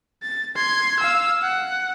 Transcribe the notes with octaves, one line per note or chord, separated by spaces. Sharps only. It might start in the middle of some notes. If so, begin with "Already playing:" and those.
A6
C6 G#6
F5 E6
F#5